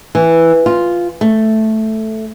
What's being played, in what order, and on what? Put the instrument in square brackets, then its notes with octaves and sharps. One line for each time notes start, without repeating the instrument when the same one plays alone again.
[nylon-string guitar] E3
F4
A3